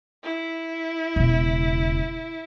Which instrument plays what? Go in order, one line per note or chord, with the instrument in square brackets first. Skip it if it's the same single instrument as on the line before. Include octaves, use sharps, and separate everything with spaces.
[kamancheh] E4
[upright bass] E1 C#3